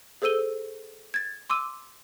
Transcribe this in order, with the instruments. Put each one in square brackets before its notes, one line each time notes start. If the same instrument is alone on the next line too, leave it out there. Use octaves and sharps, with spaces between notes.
[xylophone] G#4 A4 C5 E6 D#7 G7
G#6 A6
C6 D6 E6 D#7